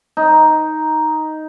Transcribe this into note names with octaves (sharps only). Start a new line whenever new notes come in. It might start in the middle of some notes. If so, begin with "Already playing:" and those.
D#4